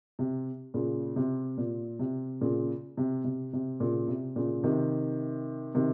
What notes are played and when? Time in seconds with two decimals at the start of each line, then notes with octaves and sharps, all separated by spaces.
0.19 C3
0.74 A#2 C#3
1.16 C3
1.58 A#2
1.99 C3
2.41 A#2 C#3
2.97 C3
3.24 C3
3.53 C3
3.80 A#2 C#3
4.08 C3
4.36 A#2 C#3
4.64 C3 D#3
5.75 C3 D#3